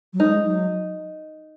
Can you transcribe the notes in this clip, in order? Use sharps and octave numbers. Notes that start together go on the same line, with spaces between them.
F#3
G#3 D#4
F#3